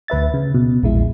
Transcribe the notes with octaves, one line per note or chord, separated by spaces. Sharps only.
D2 B4 E5 A6
C#3
B2
A#1 E2 G#3 E4